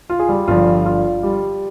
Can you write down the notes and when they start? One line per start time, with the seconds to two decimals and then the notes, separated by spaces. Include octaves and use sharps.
0.10 F4
0.19 G#4
0.29 G3 G4
0.48 G1 G2 F3 F4
0.86 F4
1.23 G3 G4